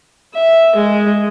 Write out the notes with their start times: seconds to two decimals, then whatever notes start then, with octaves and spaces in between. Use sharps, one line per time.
0.34 E5
0.76 G#3